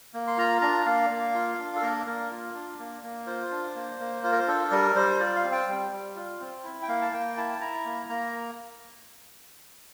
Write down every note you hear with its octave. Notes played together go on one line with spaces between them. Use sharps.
A#3
C6
F4 A#5
D4 A#5
A#3 F5
A#3
F4
D4
A4
A#3 A#4
A#3 A#4
F4
D4
A#3
A#3
F4 C5
D4
A#3
A#3
F4 C5
A#4
C5
D4 A4
G3 A#4
G3 C5
F4 D5
F5
C4
G5
G3
G3
F4
C4
E4
G5
A#3 F5
A5
A#3 G5
E4 A5
E4 A#5
A#3
A#3 A#5